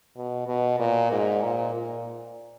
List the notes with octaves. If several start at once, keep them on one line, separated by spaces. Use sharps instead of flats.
B2
B2
A#2
G#2
A#2
A#2